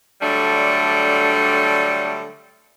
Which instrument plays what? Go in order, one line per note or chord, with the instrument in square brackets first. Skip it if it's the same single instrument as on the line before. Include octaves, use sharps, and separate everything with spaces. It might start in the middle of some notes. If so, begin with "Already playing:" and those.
[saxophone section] D3 F#3 G3 A3 D4